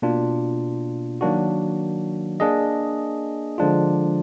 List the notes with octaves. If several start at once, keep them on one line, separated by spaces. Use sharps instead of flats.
B2 A#3 D4 F4
D#3 F#3 A#3 D4 F#4
A#3 D4 G#4 D#5
D3 F3 G#3 D4 F4